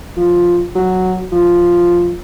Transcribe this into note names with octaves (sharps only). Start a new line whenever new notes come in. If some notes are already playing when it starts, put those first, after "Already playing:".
F3
F#3
F3